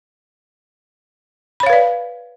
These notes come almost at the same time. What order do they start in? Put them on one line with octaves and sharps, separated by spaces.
B5 C#5 F5 B4 D5